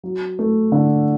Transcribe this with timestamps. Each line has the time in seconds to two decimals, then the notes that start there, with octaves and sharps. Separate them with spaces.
0.04 F#3
0.39 A3
0.72 D3